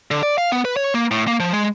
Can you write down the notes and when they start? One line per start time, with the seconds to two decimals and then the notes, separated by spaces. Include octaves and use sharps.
0.11 D3
0.23 D5
0.38 F5
0.52 B3
0.65 B4
0.77 C#5
0.94 A#3
1.11 A2
1.28 A#3
1.40 F3
1.53 G#3